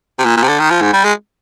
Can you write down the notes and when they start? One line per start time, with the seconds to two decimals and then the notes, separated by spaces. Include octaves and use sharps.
0.19 C3
0.25 A#2
0.37 A#2
0.43 C3
0.48 D3
0.60 D#3
0.71 F3
0.81 G#2
0.93 G3
1.05 G#3